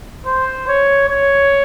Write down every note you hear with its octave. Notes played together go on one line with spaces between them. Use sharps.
C5
C#5
C#5